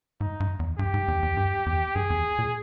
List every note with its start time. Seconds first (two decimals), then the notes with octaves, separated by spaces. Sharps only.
0.21 G#2 D#4
0.40 G2
0.59 E2
0.79 G2 G4
0.94 G#2
1.08 E2
1.23 E2
1.37 G2
1.66 E2
1.95 G2 G#4
2.10 E2
2.39 A#2